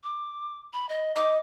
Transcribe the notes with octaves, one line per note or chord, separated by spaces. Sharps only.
D6
B5
D#5
D#5 D6